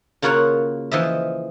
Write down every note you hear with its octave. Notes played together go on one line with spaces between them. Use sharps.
C#3 A#3 F4 F#4 C#5 F#5
E3 F3 D#5 E5